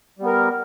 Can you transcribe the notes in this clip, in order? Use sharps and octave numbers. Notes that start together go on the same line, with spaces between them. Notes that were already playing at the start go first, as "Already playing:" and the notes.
G3 B3 A#4